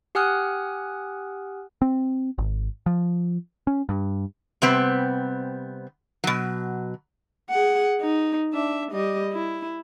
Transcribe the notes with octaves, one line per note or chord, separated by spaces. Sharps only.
G4 F#5 G#5 D#6 F6 F#6
C4
G#1
F3
C#4
G2
C3 G3 B3 C4
B2 F#3
G#4 F#5
D#4
D4 E5
G3 D#5
E4